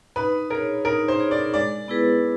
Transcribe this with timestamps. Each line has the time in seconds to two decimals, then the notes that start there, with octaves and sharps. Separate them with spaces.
0.16 D#4 B4
0.50 G#4 A#4 C#5
0.85 D#4 A#4
1.08 C5
1.20 G#4 C#5
1.31 D5
1.54 G#3 D5
1.88 B3 E4 G#4 B4